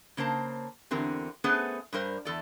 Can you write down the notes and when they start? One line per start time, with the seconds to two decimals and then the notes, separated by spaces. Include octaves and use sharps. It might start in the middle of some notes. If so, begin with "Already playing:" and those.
0.17 C#3 A#3 C5 A5
0.91 E2 D3 C4 G4 A#4
1.44 A3 B3 C#4 G#4 B4 C5
1.93 G2 G3 A#4 C5
2.25 E2 A4 D5